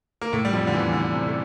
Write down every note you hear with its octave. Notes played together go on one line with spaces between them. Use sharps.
A#3
A2 A3
G3
F2 F3
D3
E2 E3
D3
C3
A3